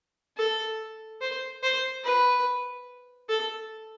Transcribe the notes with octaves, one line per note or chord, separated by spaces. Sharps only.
A4
C5
C5
B4
A4